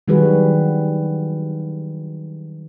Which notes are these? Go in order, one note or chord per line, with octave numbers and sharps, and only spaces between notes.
D#3 F#3 G3 F#4 G#4 B4